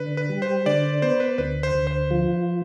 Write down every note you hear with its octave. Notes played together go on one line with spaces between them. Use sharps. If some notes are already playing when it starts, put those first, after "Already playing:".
Already playing: D3 B4
B4
G3
C5
D3 D5
B3 C5
B4
D2 B4
C5
D2
C5
F3